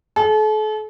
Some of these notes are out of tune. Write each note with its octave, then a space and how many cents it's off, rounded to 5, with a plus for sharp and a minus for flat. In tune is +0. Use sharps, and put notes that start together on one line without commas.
A4 -40